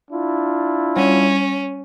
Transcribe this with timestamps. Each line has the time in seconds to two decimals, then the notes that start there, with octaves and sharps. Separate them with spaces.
0.11 D4 E4 F4
0.97 G3 C#4 C#5 D#7